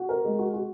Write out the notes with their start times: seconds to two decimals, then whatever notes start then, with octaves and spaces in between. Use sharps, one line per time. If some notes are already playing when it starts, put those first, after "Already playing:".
Already playing: F#4
0.09 A#4
0.24 G#3
0.39 F#4
0.54 F#4